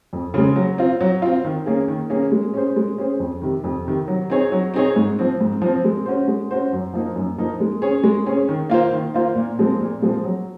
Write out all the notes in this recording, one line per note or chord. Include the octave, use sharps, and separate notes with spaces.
F2
C#3 G#3
F#3
C4 F4
F#3
C4 F4
D#3
A#3 C#4 G#4
D#3
A#3 C#4 G#4
G#3
C#4 G#4 C5
G#3
C#4 G#4 C5
F2
C3 D#3
F2
C3 D#3
F#3
C4 D#4 G#4 C#5
F#3
C4 D#4 G#4 C#5
G#2
F3 C4
G#2
F3 C4
G#3
C#4 F#4 C5
G#3
C#4 F#4 C5
F#2
F3 A#3 D#4
F#2
F3 A#3 D#4
G#3
C#4 G#4 C#5
G#3
C#4 G#4 C#5
D#3
A#3 F4 C5
D#3
A#3 F4 C5
A#2
F3 G#3 C4
A#2
F3 G#3 C4
F#3